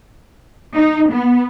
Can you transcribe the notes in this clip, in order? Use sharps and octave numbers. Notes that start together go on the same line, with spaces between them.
D#4
B3